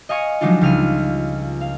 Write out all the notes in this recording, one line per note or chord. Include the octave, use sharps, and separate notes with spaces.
D#5 F5 G#5 C#6 C#7 D#7
F3 F#3 G#3 D4 D#4 F4
C#2 G3 F6 D#7
F5